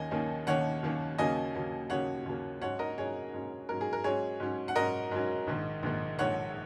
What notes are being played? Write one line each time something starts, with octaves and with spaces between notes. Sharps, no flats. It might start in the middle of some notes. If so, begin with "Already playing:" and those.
Already playing: D#2 D#3 A#3 C#4 D#5 G#5
D#2 D#3 A#3 C#4
D#2 D#3 A#3 C#4 C#5 F#5
D#2 D#3 A#3 C#4
D#2 C#3 F#3 A#3 C#4 D#5 G#5
D#2 C#3 F#3 A#3 C#4
D#2 C#3 F#3 A#3 C#4 C#5 F#5
D#2 C#3 F#3 A#3 C#4
G#2 F#3 C#4 C#5 F#5
A#4 D#5
G#2 F#3 C#4 G#4 C#5
G#2 F#3 C#4
G#2 F#3 C#4 A#4
G#4
A#4
G#2 F#3 C#4 G#4 C#5
G#2 F#3 C#4
F#5
G#2 F#3 C#4 A#4 D#5
G#2 F#3 C#4
A#1 G#2 D#3
A#1 G#2 D#3
A#1 G#2 D#3 C#5 F#5